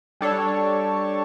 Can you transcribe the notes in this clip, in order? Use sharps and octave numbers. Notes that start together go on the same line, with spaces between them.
G3 D4 A4 C#5